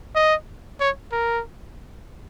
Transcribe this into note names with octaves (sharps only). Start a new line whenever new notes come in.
D#5
C#5
A#4